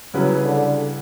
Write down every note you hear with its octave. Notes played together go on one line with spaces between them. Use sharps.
C#3 F#3 G3 C#4 E4 B4
D3